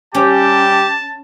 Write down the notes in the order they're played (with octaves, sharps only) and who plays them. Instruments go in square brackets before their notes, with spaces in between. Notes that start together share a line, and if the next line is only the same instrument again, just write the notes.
[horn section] G3 G4 [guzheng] C#4 [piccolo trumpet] A5